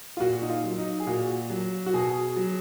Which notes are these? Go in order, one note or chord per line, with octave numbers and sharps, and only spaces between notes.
F4
A#2 F#4
D#4
F4
F#3
D#4
G#4
A#2 F#4
F#3
F#4
B2 G#4
F#3